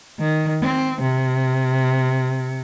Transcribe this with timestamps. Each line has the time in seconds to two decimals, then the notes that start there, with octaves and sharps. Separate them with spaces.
0.19 D#3
0.61 C4
1.01 C3